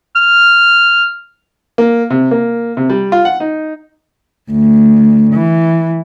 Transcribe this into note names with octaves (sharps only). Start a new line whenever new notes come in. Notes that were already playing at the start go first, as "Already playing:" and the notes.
F6
A#3
C3
A#3
C3
G3
F4
F#5
D#4
D2
E3